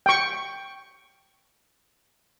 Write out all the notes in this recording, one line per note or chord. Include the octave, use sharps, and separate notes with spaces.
G5 C#6